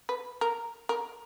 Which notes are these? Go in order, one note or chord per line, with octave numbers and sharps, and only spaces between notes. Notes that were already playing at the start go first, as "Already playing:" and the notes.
B4
A#4
A#4